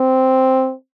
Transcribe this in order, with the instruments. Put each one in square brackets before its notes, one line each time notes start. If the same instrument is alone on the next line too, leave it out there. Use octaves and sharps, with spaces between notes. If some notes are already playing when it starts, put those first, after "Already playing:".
Already playing: [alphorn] C4